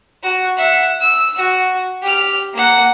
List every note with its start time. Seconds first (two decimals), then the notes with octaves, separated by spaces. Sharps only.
0.23 F#4
0.57 E5 F#5
1.00 E6
1.37 F#4
2.02 G4 F6
2.53 A#3 F#5